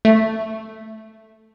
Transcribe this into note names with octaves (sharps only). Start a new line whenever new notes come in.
A3